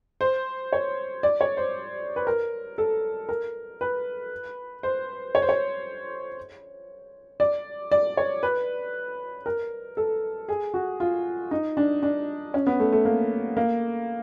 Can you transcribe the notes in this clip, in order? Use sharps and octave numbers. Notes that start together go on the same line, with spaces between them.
C5
C#5
D5
C#5
C5
B4
A#4
A4
A#4
B4
C5
C#5
C5
C#5
D5
D5
C#5
B4
A#4
A4
G#4
F#4
F4
D#4
D4
D4
C#4
B3
A3
A3
A#3
A#3